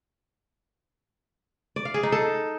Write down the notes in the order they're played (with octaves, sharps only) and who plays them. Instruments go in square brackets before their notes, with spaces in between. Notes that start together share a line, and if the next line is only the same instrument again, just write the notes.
[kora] D5
F5
G#4
D#4
A4